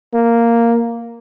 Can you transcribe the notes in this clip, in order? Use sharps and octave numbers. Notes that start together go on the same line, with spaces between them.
A#3